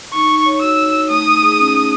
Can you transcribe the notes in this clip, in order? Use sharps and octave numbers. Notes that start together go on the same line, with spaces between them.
D#4 C#6
D#4
C#5
F#4 E6
D#4
D#4
A3 D#6
A3
G#4
C#4
A3